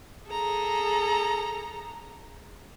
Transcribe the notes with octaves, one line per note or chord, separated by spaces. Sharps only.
G#4 A4 A#5